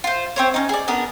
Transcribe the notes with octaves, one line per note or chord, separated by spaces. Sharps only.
F4 C5
C4 C5 C#5
C#4 D#4
G#4 D5
B3 D4 A#4